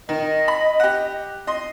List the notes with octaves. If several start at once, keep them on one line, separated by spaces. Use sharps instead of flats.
D#3 D#5
B5
G4 F#5
D#5 C6